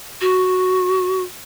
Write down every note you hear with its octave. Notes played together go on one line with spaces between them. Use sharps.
F#4